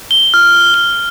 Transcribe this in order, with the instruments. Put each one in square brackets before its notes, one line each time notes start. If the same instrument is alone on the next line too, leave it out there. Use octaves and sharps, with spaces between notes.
[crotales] G7
F6
G7